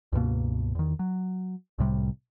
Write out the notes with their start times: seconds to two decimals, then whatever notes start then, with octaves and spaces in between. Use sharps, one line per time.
0.12 C#2 G2 B2 A#3
0.75 E2 D#3
0.99 F#3
1.78 C2 A2 C3 G3